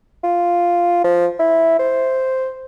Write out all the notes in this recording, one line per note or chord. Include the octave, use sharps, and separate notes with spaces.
F4
F3
E4
C5